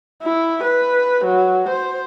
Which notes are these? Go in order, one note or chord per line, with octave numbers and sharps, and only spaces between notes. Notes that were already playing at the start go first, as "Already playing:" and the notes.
E4
B4
F#3
C5